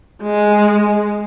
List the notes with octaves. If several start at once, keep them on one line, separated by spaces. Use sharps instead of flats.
G#3